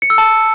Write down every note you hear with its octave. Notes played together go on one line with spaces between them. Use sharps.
C#7
E6
A5